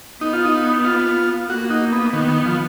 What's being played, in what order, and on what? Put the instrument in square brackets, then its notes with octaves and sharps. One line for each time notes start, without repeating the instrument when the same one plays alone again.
[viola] B3 [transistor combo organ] D#4
[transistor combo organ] F4
D#4
F4
[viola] A#3 [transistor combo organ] F#4
[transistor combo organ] D#4
B3
[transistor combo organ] D#3 [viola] B3
[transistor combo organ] D#3
F3